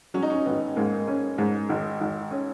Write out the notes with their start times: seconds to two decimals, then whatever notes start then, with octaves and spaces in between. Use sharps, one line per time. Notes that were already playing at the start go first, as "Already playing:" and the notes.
0.14 F#3 C#4
0.23 D#4
0.30 C#4
0.46 G#1 B3
0.76 G#2 A#3
1.08 C#4
1.38 G#2
1.69 G#1
2.01 G#1
2.31 C#4